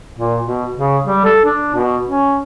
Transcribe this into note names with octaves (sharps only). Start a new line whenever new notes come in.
A#2
B2
C#3
G3
A4
D4
B2
C#4